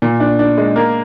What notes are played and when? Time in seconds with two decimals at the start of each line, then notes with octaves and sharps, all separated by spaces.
0.02 A#2
0.20 D4
0.39 D4
0.58 G#3
0.76 A#3